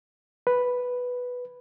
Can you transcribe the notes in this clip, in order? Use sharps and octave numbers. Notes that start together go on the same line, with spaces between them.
B4